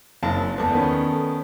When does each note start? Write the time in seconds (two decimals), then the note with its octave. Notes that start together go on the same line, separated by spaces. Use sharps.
0.23 F#1 C4 D#4 A#4 A5
0.58 E2 A3 B3 A4 D5
0.73 D#3 B3 C#4